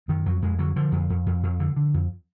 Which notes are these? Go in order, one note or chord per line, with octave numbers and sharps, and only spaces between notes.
F#2 D#3
F2 F#3
F2 G#3
D3 F#3
D3 F3
F2
F2
F2
F2
D3
D3
F2